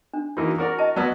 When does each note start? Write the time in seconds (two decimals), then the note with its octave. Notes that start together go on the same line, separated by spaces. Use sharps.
0.13 D4
0.37 E3 A#3 D#4 F#4
0.58 E4 F#4 A#4 D5
0.79 D#5 A5
0.96 F#3 B3 D5 A5 E6